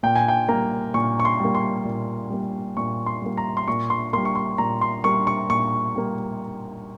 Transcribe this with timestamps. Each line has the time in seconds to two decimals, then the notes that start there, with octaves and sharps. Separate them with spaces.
0.03 A#2 G5
0.16 G#5
0.28 G5
0.49 G3 A#3 A#5
0.94 A#2 C#6
1.20 C#6
1.25 C6
1.40 G3 A#3
1.55 C6
1.85 A#2
2.30 G3 A#3
2.77 A#2 C#6
3.06 C6
3.22 G3 A#3
3.37 A#5
3.57 C6
3.68 A#2 C#6
3.90 C6
4.13 G3 A#3 C6
4.25 C#6
4.35 C6
4.58 A#2 A#5
4.81 C6
5.04 G3 A#3 C#6
5.27 C#6
5.50 A#2 C#6
5.95 G3 A#3